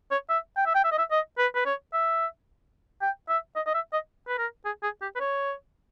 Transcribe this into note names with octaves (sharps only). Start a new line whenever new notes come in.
C#5
E5
G5
E5
G5
E5
D#5
E5
D#5
B4
B4
C#5
E5
G5
E5
D#5
D#5
E5
D#5
B4
A#4
G#4
G#4
G4
B4
C#5